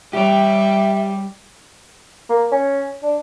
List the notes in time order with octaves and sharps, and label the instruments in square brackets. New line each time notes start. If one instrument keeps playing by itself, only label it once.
[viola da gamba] G3 [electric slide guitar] G4 C#5 [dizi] E5
[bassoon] A#3
C#4
D4